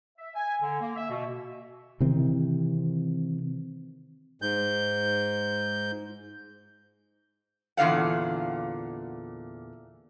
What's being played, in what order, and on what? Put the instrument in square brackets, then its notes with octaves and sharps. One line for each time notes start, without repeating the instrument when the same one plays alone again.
[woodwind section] E5
G#5
D3
A#3
E5
B2
[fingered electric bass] C3 D#3 E3 C4
[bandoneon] G#2 G6
[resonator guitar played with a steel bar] E2 A#2 D3 F5 F#5